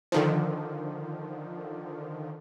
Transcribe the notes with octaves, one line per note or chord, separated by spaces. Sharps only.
D3 D#3 F3